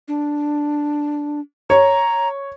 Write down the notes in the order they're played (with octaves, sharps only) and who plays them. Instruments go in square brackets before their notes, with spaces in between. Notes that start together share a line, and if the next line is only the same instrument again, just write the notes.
[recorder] D4
[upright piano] C#5 [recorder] A#5